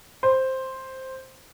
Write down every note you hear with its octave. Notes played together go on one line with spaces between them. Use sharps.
C5